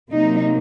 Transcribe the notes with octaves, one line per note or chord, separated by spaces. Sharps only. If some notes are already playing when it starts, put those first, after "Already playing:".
C3 F#3 A#3 D#4